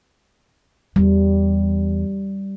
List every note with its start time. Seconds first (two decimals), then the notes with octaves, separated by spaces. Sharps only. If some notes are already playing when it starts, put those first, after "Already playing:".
0.96 E2 G3